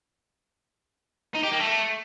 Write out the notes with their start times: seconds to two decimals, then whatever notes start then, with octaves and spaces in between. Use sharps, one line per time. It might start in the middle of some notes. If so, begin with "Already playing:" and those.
1.35 D#4
1.44 G4
1.52 A#3
1.61 A3